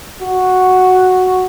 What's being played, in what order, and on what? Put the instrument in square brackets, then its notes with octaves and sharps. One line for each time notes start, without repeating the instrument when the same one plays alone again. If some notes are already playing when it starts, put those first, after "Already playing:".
[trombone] F#4